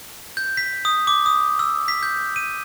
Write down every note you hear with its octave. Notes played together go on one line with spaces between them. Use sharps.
G6
B6
D#6
D6
D#6
E6
B6
G6
D#7